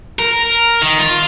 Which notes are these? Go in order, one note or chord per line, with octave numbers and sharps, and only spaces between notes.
A#4
D#3
F4